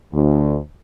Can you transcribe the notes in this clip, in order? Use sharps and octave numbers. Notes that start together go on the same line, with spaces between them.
D2